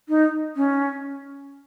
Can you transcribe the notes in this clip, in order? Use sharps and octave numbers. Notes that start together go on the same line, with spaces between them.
D#4
C#4